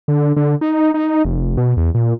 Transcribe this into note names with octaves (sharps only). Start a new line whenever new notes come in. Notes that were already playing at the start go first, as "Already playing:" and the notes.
D3
D3
D#4
D#4
F1
B2
E2
A#2